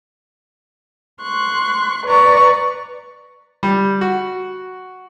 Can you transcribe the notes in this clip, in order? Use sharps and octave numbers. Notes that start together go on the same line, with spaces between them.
C6 C#6 F#6
B4 D5 A#5 C#6
G3
F#4